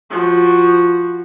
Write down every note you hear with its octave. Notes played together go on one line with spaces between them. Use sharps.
F3 F#4